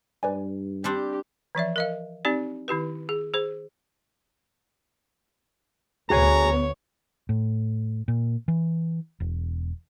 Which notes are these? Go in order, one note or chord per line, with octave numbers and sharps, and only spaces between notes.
G2 B4 D5 G#5
G3 C4 D4 G4
E3 F3 D5 E5
A#4 D#5 F5
C4 D#4 G4 D5
D#3 E4 G4 B4
G#4
G#4 C5
D2 B3 F#4 G#4 C#5 G#5 A#5
A2
A#2
E3
E1